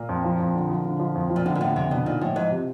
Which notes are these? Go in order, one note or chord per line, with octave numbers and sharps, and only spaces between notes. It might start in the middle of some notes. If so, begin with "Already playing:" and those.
Already playing: A#2
F2
F3
F2
D3
F3
D3
F3
F2
F3
A#2
A2 D3
A#2
A2 D3
F2 C3
B2 D3
A#2 D#4
A2 F3
G#2 F3
C3